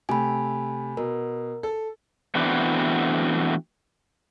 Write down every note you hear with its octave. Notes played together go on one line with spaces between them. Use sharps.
C3 A3 G#5 B5
B2 A#4
A4
E3 A3 B3 C4 D4 F#4